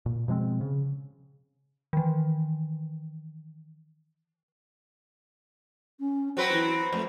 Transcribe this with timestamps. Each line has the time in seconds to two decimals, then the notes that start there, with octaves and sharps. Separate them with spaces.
0.06 A#2
0.28 B2 F3 G#3 C4
0.61 C#3
1.93 D#3 E3
5.99 C#4
6.37 F#3 C4 F#4 B4
6.51 E3
6.92 F2 A3